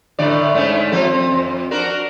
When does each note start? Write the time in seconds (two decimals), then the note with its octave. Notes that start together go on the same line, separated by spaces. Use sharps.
0.19 A2 D3 D5
0.55 G#2 A3 C#4
0.92 F3 C4 A4
1.14 C4
1.32 F2
1.71 D4 F#4 A#4